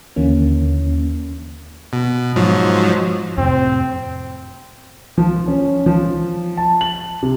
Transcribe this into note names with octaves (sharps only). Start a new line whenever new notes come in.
D#2 D3 E3 A#3 C#4
B2
G#2 F3 F#3
F2 A2 C3 C4
F3
C#4
F3
A5
F#7
C3